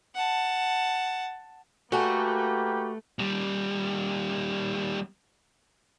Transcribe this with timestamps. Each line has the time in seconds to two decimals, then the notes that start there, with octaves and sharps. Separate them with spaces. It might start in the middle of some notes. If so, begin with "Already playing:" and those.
0.15 F#5 A5
1.92 A3 A#3 F#4 G4 A4 B4 G#5 A5
3.19 D#2 G3